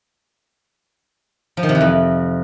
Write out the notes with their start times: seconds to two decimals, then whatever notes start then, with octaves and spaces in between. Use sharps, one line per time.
1.57 F3
1.63 D#3
1.69 C3
1.75 E3
1.81 F2